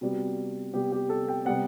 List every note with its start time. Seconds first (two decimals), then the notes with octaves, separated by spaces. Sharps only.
0.01 C3 G3 B3 F#4
0.74 C3 G3 B3 G4
0.92 G4
1.09 A4
1.28 G5
1.45 C3 G3 B3 F#5